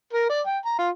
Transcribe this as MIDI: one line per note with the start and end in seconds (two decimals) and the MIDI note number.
0.13 0.27 70
0.29 0.41 74
0.47 0.58 79
0.65 0.75 82
0.79 0.89 65